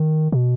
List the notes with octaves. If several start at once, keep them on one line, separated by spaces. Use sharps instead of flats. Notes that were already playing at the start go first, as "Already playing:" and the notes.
Already playing: D#3
B2